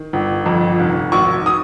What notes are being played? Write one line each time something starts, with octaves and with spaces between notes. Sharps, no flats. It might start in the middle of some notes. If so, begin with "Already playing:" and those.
Already playing: D#3
G1
F2
F1
G#1 C#6
D#6